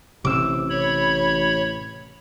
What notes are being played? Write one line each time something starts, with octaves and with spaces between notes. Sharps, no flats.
A1 C3 D6 E6
C#5 B5